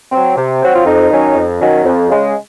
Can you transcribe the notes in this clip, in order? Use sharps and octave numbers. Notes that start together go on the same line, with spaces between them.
F#3 C4
C3
F#3 C4 F#4
F4
F2 D#4
D#3 F#3 C#4
F2
D#3 F#3 C#4
F2
C#3 G#3